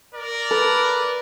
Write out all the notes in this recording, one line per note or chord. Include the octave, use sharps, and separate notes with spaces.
A#4 D5
A4 B4